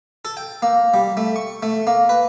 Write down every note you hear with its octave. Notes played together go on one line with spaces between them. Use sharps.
A4
G5
A#3
G3
A3
C#6
A3
A#3
B4